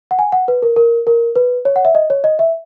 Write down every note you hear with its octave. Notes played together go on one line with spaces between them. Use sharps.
F#5
G#5
F#5
B4
A#4
A#4
A#4
B4
C#5
F#5
E5
D#5
C#5
D#5
E5